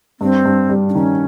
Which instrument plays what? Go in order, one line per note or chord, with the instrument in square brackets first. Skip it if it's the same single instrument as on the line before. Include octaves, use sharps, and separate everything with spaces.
[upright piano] G2 [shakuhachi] C4
[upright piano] G2
G3
[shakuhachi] D4
[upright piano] D#3 [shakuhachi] C#4